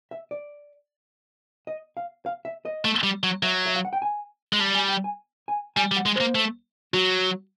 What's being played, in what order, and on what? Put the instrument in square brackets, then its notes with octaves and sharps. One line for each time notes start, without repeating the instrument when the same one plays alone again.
[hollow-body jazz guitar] E5
D5
D#5
F5
F5
E5
D#5
[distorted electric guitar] A3
G3
F#3
[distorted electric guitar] F#3 [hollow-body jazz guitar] E5
[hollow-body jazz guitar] E5
F5
F#5
G5
G#5
[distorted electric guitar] G#3
[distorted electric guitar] G3 [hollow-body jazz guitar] A5
[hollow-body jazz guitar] G#5
G5
G#5
G#5
[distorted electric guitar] G3 [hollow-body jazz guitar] G#5
[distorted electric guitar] G3
[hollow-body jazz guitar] F#5
[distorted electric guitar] G#3
[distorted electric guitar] A#3 [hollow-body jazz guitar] C5
[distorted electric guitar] A3
[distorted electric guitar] F#3 [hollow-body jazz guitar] F#4